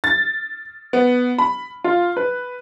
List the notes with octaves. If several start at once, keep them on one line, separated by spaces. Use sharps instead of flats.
A6
B3
B5
F4
B4